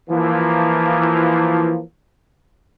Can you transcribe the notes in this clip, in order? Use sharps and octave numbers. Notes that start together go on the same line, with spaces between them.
E3 F3 A#3